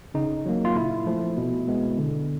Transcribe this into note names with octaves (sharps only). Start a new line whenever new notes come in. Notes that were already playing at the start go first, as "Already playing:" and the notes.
C#3 D#4
F#3 A#3
F4
A#2 E4
F3 A3
B2
G#3 B3
D3